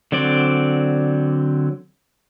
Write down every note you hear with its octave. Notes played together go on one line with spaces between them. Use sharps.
D3 F#3 C4 D5